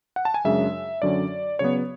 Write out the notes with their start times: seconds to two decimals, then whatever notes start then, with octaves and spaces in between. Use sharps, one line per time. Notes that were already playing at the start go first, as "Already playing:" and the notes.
0.16 F#5
0.25 A5
0.34 G#5
0.45 F#2 C#3 G#3 D4 E5
1.02 F#2 D3 F#3 C#4 D5
1.59 C#3 F#3 B3 C#5